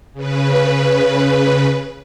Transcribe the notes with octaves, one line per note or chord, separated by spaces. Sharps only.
C#3 B4